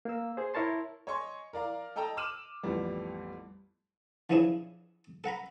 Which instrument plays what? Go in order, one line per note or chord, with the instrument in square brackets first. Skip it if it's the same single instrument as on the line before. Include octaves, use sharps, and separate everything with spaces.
[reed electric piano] A#3 E6
G#4 C5
E4 A#4 C#5 A5 C6
[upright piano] C#5 D#5 G#5 C6 C#6
A#4 D5 F5 A#5
A4 D#5 G5 A5 A#5 E6
D6 E6 F6 D#7 E7 F#7
A1 F2 G3 B3
[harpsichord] E3 F3 C#4 D4 E4 G#4
A4 F#5 A#5 B5